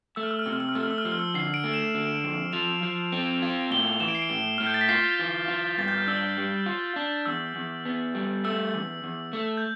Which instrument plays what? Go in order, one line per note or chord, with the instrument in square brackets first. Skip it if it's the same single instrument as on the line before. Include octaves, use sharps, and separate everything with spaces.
[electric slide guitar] A3 [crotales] E6
[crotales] F6
E6
F6
[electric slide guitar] C3 [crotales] E6
[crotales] F6
E6
F6
[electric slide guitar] A3 [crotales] E6
[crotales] F6
E6
F6
[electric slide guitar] F3 [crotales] E6
[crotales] F6
E6
[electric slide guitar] D3 [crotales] C7
[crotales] D7
[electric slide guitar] A3
[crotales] E7
[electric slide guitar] D3
F2
[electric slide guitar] F3 [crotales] F7
[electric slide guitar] F3
C4
F4
[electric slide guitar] A2 [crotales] G7
[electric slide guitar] E3 [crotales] E7
[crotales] D7
C7
D7
[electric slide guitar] A2
[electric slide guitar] A2 [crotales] F6
[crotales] G6
A6
B6
[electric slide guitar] F4 [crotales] C7
[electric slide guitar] E3
F4
[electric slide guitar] G2 [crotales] A6
[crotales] G6
F6
[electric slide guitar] D4 [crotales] E6
[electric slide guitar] G3
F4
D4
[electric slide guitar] E2 [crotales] E6
[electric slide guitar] E2
B3
G3
[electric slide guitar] A3 [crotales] E6
[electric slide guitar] E2
E2
A3
[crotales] G6